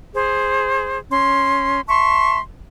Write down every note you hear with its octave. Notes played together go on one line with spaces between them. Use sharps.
G#4 C5
C#4 C6
E5 A5 C6 C#6